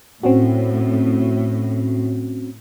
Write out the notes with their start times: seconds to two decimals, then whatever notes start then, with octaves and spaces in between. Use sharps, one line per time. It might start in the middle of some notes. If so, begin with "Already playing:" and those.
0.23 A2 C4 C#4 F#4